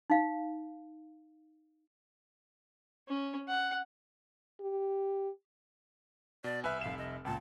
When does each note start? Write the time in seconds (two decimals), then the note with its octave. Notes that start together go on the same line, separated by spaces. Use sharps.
0.10 D#4 F5
3.08 C#4
3.48 F#5
4.61 G4
6.44 B2 D5
6.64 C2 B4 E5 G#5 E6 F6
6.81 F1 F5 E7
6.98 D#5
7.25 C#2 A#2 A5